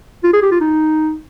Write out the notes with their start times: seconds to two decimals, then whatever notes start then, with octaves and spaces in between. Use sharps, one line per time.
0.24 F4
0.33 G#4
0.42 G4
0.51 F4
0.61 D#4